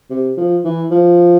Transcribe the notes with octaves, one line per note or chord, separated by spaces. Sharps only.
C3
F3
E3
F3